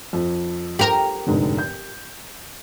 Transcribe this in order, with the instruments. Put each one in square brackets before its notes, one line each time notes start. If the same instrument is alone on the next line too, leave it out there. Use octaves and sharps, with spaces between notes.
[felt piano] F2
[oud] G4 A#4
[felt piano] F1 G#2 D3
G6